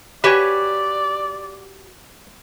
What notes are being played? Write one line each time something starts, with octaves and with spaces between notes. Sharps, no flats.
F#4 G4 B4 C#5 D5 G#5